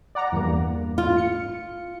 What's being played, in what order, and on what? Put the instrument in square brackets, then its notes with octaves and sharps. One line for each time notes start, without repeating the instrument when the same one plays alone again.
[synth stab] D5 F#5 A#5
E2 G2 A#3
[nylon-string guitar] F4
[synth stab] C#7